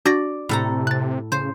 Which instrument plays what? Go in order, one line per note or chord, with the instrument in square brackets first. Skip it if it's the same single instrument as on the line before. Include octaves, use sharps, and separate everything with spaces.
[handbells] D4 F#4 A#6 [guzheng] D5
[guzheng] A2 A4 A#5 [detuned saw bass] C3
[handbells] F#6 A6
[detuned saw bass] C#3 [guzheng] C5